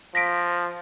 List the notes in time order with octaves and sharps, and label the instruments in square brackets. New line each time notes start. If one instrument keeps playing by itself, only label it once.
[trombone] F3 [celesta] A#6 B6 D7